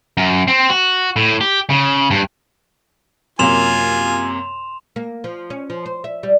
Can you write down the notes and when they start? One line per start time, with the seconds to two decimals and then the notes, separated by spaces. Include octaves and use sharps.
0.17 F#2
0.48 C4
0.70 F#4
1.16 A2
1.41 G4
1.70 C#3
2.11 G2
3.39 F#2 C3 A#3 F4 G#5 C6 E7 F7
4.96 A#3
5.24 F3
5.50 C#4
5.70 F3
5.86 C5
6.04 E5
6.23 G3